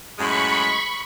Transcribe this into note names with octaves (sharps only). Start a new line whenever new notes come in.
F#2 A2 G#3 B5 C#6